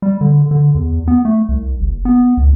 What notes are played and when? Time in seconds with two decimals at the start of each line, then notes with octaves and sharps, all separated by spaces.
0.02 G3
0.21 D3
0.51 D3
0.75 E2
1.08 B3
1.25 A3
1.49 C2
1.80 F#1
2.05 B3
2.37 C#2